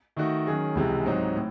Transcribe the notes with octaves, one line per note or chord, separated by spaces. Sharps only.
D#3 A3 D#4 F#4
D#3 F#3 C#4 G#4
C#2 C3 E3 G#3
G#2 F#3 C4 D#4
A2